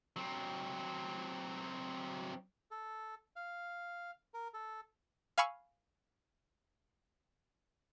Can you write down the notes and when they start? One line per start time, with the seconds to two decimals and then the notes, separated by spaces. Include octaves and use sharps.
0.16 F#3 C4
2.71 A4
3.36 F5
4.34 A#4
4.54 A4
5.38 F5 G#5 B5 C#6 E6